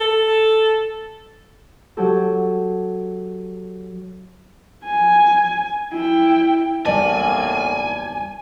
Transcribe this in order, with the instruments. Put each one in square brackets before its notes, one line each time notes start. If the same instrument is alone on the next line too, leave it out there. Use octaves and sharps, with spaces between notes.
[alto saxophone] A4
[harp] F#3 G4 A4
[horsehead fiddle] G#5
E4 G5
[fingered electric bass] F#1 E2 G3 [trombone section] A2 A#3 [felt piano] D5 A5 [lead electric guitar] G#5